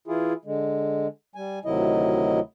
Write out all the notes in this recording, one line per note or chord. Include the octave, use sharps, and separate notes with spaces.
E3 E4 F4 G#4
D3 G#3
G3 G#5
D2 C3 D#3 F#3 E4 D#5